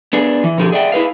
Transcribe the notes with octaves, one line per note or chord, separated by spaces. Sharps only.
B3 D4 G#4
E3
B2 D3 F3 G4 G#4
G#4 D5 E5 F#5 G5
E4 G#4 B4 F5